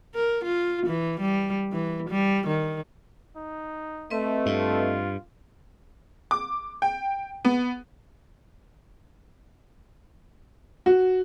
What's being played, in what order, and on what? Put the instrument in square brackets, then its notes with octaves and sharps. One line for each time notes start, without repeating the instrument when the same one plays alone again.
[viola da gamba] A#4
F4
E3
G3
E3
G3
D#3
[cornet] D#4
[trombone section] A3 [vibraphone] C4 B4 D#5
[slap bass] G2 [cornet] F4
[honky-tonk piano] D6
G5
B3
[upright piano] F#4